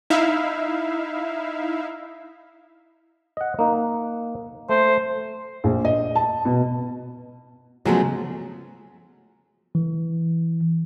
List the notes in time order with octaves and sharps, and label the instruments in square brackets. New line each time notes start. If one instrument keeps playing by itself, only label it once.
[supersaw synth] D#4 E4 E5 F5
[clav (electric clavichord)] D#5 F#5
A#3 D#4
[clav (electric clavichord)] A3 [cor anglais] C5
[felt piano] A#1
D#5
A5
B2
[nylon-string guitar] C#3 F3 B3 [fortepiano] F#3 G#3 A3
[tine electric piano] E3